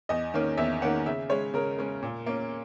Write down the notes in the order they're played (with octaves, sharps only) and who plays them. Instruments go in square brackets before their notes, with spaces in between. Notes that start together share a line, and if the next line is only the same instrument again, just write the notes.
[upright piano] E2 D#5
D#3 A#3 C#4
E2 E5
D#3 A#3 C#4 F#5
C#3 E5
G#3 C#4 C#5
C#3 A#4
G#3 C#4
A#2
A#3 C#4